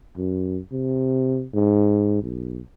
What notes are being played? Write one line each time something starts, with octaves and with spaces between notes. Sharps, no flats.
F#2
C3
G#2
B1